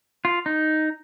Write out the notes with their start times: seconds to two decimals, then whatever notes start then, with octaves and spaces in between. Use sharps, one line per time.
0.25 F4
0.46 D#4